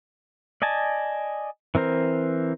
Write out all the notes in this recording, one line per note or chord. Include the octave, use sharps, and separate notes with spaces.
D5 D#5 G#5 A5
E3 C4 A#4 C5